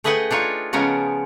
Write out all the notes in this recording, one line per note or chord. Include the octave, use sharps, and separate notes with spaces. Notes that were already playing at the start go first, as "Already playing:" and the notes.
A3 G#4 B4 D#5 F#5 G5
D4 D#4 F4 C#5
C#3 F3 G#3 B3 C#4 A#4